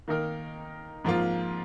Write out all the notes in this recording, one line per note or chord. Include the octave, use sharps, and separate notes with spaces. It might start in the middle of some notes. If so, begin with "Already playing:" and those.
D#3 A#3 D#4 A#4
G#2 F3 A#3 F4